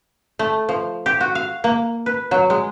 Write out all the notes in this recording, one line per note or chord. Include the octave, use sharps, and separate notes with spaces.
A3
F3
G4
F#4
F5
A#3
B4
F#3
G#3